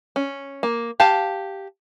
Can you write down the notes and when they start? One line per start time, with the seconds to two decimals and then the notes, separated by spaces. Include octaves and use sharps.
0.16 C#4
0.63 A#3
1.00 G4 F5 A5